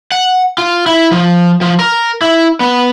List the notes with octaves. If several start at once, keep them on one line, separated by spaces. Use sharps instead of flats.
F#5
F4
E4
F3
F3
A#4
E4
B3